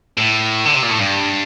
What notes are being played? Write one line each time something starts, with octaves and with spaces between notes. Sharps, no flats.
A2
D3
C3
A#2
A2
G2